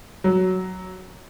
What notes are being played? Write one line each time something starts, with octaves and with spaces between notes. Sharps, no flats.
F#3